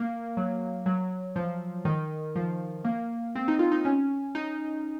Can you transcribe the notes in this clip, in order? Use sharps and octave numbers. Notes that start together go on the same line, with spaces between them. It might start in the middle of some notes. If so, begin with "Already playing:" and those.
Already playing: A#3
F#3
F#3
F3
D#3
F3
A#3
C4
D#4
F4
D#4
C#4
D#4